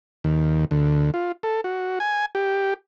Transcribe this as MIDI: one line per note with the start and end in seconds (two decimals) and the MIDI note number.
0.24 0.65 39
0.71 1.11 38
1.14 1.32 65
1.43 1.61 69
1.64 1.99 66
2.00 2.26 80
2.35 2.74 67